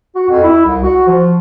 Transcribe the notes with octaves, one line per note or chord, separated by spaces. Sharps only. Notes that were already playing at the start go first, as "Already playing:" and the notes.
F#4
F2
E4
C2
F#4
F3